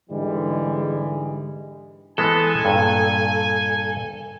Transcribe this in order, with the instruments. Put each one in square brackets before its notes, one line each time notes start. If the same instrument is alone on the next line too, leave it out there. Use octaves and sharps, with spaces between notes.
[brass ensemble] G#2 D3 E3 G3 G#3
[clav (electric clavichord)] E3 G#3 B3 [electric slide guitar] A4 [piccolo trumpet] G#5
[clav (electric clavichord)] G2 A#2